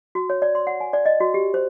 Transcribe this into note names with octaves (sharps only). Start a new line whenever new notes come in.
F#4
C#5
D5
C6
F#5
G#5
D5
D#5
F#4
G4
C5